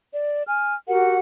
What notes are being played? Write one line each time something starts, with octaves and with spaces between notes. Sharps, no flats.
D5
G#5 F6
F#4 G4 A#4 F#5